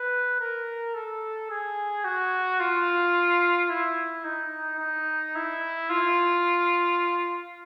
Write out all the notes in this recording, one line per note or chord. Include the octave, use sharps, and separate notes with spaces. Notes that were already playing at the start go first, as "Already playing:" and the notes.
Already playing: B4
A#4
A4
G#4
F#4
F4
E4
D#4
D#4
E4
F4